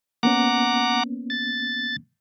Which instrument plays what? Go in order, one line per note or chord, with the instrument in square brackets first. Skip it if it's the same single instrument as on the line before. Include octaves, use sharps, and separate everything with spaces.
[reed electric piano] A#3 B3 C#4 [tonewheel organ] F#5 A#5 D6
[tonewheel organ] A6